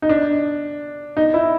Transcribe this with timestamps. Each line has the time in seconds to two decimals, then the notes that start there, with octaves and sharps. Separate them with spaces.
0.02 D#4
0.09 D4
1.17 D#4
1.34 E4